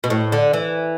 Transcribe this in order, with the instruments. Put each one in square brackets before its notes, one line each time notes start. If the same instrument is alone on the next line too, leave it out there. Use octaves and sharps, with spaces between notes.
[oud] B2
A2
D3
E3